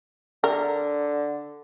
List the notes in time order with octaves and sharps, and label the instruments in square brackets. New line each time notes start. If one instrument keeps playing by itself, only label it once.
[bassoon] D3 [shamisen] A#4